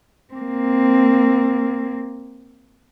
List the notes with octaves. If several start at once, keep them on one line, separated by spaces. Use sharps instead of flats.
A#3 C4